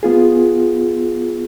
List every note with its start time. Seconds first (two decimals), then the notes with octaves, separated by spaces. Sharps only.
0.03 B3 F4 G#4